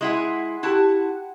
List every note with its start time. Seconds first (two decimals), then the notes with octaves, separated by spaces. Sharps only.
0.01 G#3 E4 G#4 F#5 C6
0.63 E4 F#4 G4 F#5 A5